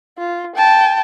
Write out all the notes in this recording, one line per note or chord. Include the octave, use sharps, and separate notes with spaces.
F4
G5 A5